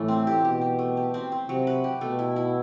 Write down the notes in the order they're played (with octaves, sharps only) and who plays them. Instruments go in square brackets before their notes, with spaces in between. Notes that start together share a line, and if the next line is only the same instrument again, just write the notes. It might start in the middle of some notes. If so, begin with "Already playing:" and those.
Already playing: [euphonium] A2 [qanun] E3 A3
[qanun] C4
G4
[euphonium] B2 [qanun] G4
[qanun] G4
A3
G4
C4
C4
[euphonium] C3 [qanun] F#3
[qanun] B4
G4
[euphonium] B2 [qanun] A3
[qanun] E4
E4